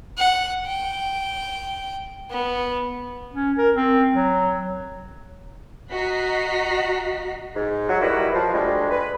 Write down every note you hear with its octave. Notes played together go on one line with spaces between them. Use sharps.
F#5
G5
B3
C#4
A#4
C4
F#3
F#4 D#5 F#5 A#5 B6 C7
G#2
F#3
D#3 G3 D#4 E4 F#4 B4
F3
D2 G3 G#3
B4